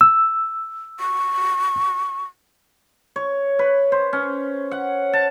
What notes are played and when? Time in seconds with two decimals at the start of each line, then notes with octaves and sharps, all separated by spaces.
0.01 E6
1.00 C#6
3.16 C#5
3.59 B4
3.92 C5
4.13 C#4
4.71 F#5
5.13 A5